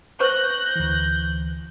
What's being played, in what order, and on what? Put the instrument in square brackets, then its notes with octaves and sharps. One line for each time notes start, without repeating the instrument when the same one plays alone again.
[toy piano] B4 C5 C#6 [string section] F#6 A#6 [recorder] G6
[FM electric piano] D2 E3